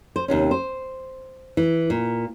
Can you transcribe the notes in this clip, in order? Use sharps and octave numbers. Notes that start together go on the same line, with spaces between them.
C5
D#2 C3 C#4
C5
E3
A#2